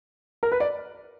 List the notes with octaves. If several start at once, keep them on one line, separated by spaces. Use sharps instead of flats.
A#4
B4
D5